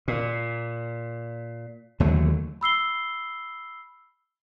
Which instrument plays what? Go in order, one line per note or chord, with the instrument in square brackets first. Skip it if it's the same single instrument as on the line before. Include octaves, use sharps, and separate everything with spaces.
[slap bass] A#2
D#2 D3 F#3 A3
[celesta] B5 E6 C7 G7